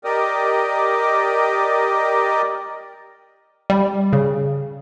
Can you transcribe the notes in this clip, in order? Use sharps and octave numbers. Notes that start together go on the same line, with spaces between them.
G4 A#4 D5 D#5
G3
C#3